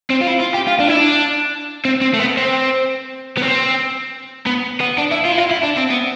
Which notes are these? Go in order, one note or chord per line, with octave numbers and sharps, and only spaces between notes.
C4
F4
E4
F4
G4
F4
D4
E4
D4
C4
C4
A3
B3
C4
B3
C4
B3
B3
D4
E4
F4
E4
F4
E4
D4
C4
B3